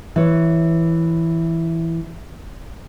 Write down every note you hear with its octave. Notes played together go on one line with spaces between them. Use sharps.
E3 C#5